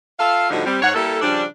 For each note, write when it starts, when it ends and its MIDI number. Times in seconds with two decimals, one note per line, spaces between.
0.18 0.47 65
0.18 0.47 69
0.18 0.47 76
0.18 0.47 77
0.50 0.62 45
0.50 0.62 50
0.50 0.62 53
0.50 0.62 55
0.50 0.62 63
0.50 0.62 66
0.65 0.78 55
0.65 0.78 60
0.82 0.91 44
0.82 0.91 73
0.82 0.91 78
0.95 1.22 55
0.95 1.22 58
0.95 1.22 64
0.95 1.22 69
1.22 1.44 49
1.22 1.44 53
1.22 1.44 55
1.22 1.44 62